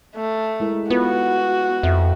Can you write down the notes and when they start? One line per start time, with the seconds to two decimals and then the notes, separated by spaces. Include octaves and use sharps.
0.16 A3
0.60 G#3 E4 A#4
0.90 B3 F4 F#4 B4
1.83 F2 E5